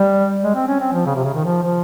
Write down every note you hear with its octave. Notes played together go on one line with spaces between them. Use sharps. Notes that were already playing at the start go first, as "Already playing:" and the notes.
Already playing: G3
G#3
C4
C#4
C4
F3
C#3
C3
C#3
D#3
F3
F3